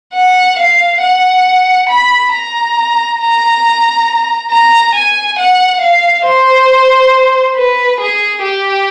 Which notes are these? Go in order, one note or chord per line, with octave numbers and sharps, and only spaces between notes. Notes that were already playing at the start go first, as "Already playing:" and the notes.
F#5
F5
F#5
B5
A#5
A#5
A#5
G#5
F#5
F5
C5
B4
G#4
G4